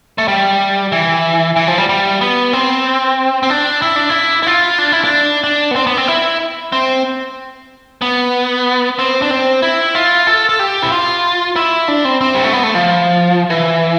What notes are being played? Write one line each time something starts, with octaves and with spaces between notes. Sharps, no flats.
A3
G3
E3
E3
F3
G3
G3
B3
C4
C4
D4
E4
D4
E4
E4
F4
D4
E4
D4
D4
B3
C4
B3
C4
E4
C4
B3
C4
D4
C4
E4
F4
A4
A4
G4
E4
F4
E4
D4
C4
C4
G3
A3
B3
A3
F3
E3